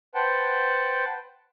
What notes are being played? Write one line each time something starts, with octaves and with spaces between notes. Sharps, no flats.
B4 C5 F#5 G5 A5